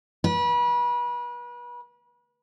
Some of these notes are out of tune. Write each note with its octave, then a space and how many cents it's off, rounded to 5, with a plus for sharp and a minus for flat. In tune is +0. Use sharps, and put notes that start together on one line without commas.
B4 -35